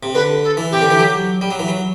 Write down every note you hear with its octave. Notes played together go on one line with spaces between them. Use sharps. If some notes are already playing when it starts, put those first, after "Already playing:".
C3
D3 B4
A4
E3
C3 G4
D3
E3
F#3
G3
F#3
E3
F#3